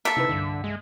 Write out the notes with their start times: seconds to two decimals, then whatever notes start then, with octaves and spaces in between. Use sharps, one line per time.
0.05 A#3 A4 E5
0.17 C3 D#4 E4 B4
0.29 C2 G2 D3
0.64 G#3